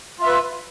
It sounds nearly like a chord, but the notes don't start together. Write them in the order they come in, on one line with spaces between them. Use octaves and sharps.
F4 E5 B4